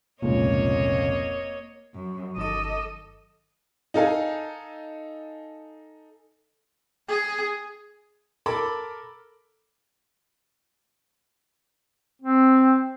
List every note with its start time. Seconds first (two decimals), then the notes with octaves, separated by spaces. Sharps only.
0.22 F1 C#2 A#2 A#3 C#5 D#5
1.95 F#2
2.37 G1 D#3 A4 D#5 D6
3.94 D#4 A4 F5 G#5
7.09 G#4
8.46 A4 A#4 B5 D6
12.22 C4